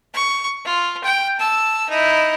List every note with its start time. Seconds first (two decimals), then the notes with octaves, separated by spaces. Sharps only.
0.14 C#6
0.65 F4
1.04 G5
1.39 A5 E6
1.89 D#4 E4